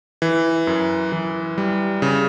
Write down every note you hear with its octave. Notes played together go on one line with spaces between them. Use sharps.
E3
F#2
E3
G3
C#3